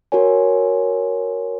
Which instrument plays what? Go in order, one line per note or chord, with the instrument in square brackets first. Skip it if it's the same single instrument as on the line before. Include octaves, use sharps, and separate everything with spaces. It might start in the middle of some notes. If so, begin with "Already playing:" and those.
[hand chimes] F#4 A#4 C#5 G#5